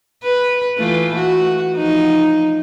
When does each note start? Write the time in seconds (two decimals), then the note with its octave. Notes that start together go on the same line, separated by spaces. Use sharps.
0.24 B4
0.77 E3 A3 F4
1.16 F#4
1.76 F3 D#4